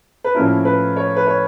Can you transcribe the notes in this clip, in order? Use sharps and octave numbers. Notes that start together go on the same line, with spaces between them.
B4
A2 F3 A#3 C#4 E4 A#4
B4
C#5
B4
C#5